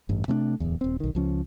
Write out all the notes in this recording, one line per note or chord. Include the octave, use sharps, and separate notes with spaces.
A1 G2
C3 A3 C#4 D4
D1 E2
D#1 C4
B1 D#3
C#2 F3 C#4